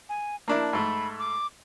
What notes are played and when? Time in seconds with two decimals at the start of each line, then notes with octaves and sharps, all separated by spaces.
0.09 G#5
0.48 A#3 D4 E4 A5
0.73 G#2 A3 B5
1.19 D6